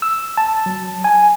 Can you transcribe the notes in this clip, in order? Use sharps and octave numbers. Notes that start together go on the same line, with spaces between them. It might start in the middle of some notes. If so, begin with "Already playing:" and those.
E6
A5
F#3
G#5